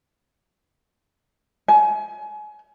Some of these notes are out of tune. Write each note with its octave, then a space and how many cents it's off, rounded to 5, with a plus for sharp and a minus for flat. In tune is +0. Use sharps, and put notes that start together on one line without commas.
G#5 +30